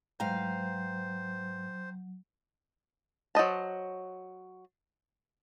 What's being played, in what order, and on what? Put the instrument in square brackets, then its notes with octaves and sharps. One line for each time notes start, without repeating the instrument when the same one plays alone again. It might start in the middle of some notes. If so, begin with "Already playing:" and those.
[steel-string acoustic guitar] G#2 B4 F5 [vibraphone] F#3 [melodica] C5 [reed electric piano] G5 A#5
[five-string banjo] F#3 C5 D#5 A5